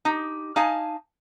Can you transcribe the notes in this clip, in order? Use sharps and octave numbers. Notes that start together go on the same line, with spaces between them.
D#4 G4
D#4 F5 G#5 A5